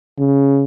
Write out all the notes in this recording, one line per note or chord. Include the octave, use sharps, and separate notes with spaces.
C#3